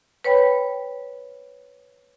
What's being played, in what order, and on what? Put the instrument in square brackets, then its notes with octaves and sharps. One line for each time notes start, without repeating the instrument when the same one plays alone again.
[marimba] B4 C#5 G5 B5